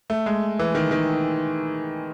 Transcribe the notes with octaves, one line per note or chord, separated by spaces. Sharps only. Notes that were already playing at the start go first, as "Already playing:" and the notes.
A3
G#3
E3
D#3
D#3